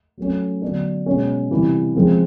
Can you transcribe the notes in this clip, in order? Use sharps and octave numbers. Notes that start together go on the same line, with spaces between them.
F#3 A3 C#4
D3 F#3 B3 D4
B2 G#3 C#4
C3 E3 G3
C#3 F3 G#3 C4